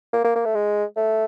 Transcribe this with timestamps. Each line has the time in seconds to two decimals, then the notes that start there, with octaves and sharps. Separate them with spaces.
0.13 A#3
0.24 A#3
0.35 A#3
0.45 A3
0.55 G#3
0.97 A3